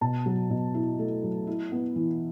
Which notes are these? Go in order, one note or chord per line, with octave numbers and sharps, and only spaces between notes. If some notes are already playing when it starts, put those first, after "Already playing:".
B2 A5
F#3
B2
E4
A3
F#3
E4
B3
E3